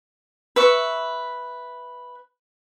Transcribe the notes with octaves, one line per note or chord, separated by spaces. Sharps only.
B4 E5 C#6